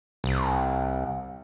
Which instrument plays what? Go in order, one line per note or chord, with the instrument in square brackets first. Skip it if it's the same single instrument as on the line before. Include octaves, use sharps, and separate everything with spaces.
[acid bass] C2